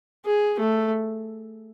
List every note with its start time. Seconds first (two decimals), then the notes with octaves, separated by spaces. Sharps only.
0.26 G#4
0.59 A3